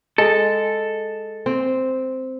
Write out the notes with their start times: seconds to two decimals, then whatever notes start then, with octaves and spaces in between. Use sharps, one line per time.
0.18 G#3 A4
1.46 C4